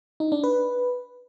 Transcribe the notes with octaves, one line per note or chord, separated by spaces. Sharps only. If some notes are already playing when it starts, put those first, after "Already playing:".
D#4
D4
B4